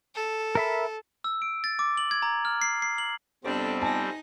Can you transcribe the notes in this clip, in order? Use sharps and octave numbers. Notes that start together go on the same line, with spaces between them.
A4
A#4 E5 B5
E6
D7
A6
D6
F#7
G#6
A#5
F6
C7
C7
F#7
F2 C3 G3 B3 C4 D4 A4
D#4 G#5 A5